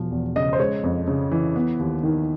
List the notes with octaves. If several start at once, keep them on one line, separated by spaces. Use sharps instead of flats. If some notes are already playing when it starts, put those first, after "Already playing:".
Already playing: E1 F3
E2
C#3 D#5
C5
G#3 C#5
F2
C#3
E3
B3
D#2
D#3